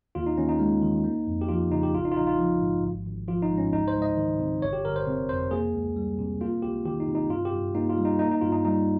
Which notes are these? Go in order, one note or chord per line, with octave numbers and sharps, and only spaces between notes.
D#2 F4
D#4
D#2 C#4
D#4
G#3
D#3
A#3
F2
G4
F3 F4
C#3 D#4
G4
A#1 F4
D#4
F4
A#1 D#4
F4
F3
G#2
G#1
G#1
F3 F4
D#4
G#2
C#4
C#2 D#4
C5
C#2
D#5
D#3
C3
G1 C#5
G4
G1 A#4
C5
C3
F2 C5
A#3 G#4
C#2
G3
C3
A#3 F4
C#2 G4
D#3 G4
D#4
C3
D#4
G2 F4
G4
G2
A#3 D#4
F4
G3
D#4
A#3 D#4
D#4
G2 F4
D#4
G3 D#4